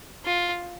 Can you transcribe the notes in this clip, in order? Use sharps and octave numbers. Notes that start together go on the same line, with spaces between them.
F4